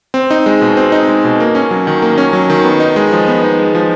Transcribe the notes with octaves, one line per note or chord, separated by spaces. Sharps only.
C4
D#4
G#3
B2
C4
D#4
G#3
B2
A#3
C#4
F#3
D#3
A#3
C#4
F#3
D#3
B3
D#4
G#3
F3
B3
D#4
G#3
F3